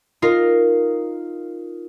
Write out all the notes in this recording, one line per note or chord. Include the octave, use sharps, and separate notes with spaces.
D#4 F4 A#4 F5